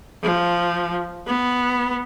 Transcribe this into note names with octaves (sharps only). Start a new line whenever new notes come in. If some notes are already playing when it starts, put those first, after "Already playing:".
F3
B3